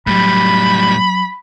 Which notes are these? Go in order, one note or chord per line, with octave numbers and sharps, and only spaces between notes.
A2 F#3 G3 B5